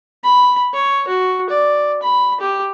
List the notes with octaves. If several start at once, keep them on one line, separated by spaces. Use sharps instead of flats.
B5
C#5
F#4
D5
B5
G4